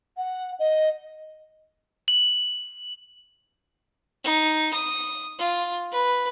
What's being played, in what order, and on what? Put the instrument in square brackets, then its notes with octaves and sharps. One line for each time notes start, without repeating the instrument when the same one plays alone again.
[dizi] F#5
D#5
[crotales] F#7
[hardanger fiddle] D#4
D#6
F4
B4